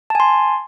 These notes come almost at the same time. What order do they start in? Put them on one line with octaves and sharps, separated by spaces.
A5 G#5 C6